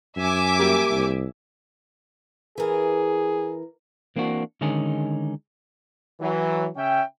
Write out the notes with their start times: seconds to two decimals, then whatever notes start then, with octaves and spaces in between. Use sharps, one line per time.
0.17 F#2 E5 G#5 D6
0.59 G3 A#3 G4
0.91 C2
2.58 E3 G#4 A#4
4.16 E3 A#3 C4 D4 F#4
4.61 D3 D#3 G#3 C#4 D#4 G#4
6.20 E3 F#3
6.76 C#3 C#4 E5 G5